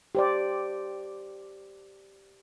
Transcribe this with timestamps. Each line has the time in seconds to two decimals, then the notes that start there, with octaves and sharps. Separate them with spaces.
0.15 G4 C5 D5